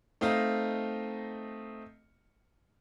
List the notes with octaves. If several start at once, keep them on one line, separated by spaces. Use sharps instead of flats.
A3 C4 D#4 D#5 F5